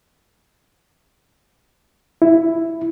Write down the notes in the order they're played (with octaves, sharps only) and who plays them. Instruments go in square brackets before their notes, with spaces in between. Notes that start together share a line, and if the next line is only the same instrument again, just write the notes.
[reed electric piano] E4